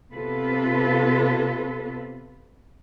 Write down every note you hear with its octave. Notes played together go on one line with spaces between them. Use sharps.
C3 B3 C4 F4 A4 B4